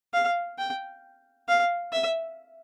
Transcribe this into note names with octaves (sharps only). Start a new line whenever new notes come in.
F5
G5
F5
E5